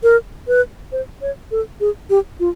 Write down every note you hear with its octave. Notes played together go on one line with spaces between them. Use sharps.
A#4
B4
C5
C#5
A4
G#4
G4
F4